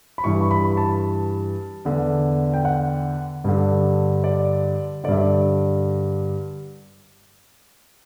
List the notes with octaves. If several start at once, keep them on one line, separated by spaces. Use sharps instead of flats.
B5
G2 E3 C#6
C#6
B5
A5
E2 D3
G5
F#5
G2 D3
D5
G2 D3 D5 E5
D5